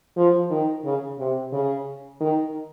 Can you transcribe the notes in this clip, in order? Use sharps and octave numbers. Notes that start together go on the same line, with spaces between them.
F3
D#3
C#3
C3
C#3
D#3